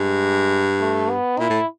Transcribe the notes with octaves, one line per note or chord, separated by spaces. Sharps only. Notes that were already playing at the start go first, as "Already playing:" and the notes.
Already playing: G2 G#3
A3
B3
A#2 E4
A2